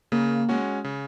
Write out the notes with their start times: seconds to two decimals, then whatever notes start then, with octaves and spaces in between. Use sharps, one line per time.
0.12 C#3 A#3
0.49 G#3 C#4 F#4
0.84 C#3